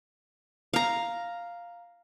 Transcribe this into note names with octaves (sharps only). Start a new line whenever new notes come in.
F5 A#5